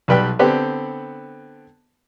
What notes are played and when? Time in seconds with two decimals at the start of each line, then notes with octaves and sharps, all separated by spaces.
0.08 B1 G3 B4 G5 F#6
0.39 D3 B3 C4 G4 B4